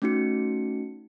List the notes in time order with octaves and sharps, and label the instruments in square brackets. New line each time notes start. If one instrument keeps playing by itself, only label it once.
[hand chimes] A3 C#4 D#4 F#4 C#7